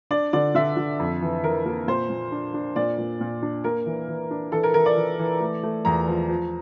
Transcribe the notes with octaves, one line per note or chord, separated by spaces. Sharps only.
D4 D5
D3 D5
D3 E5
D3
F2
E3
E3 A#4
A#3
A#2 C5
A#2
D4
D4
A#2 D5
A#2
A#2
D4
A#3 A#4
E3
E3
D4
E3 A4
A#4
E3 A#4
D5
E3
E3
A3
A3
E2 A#5
F3
F3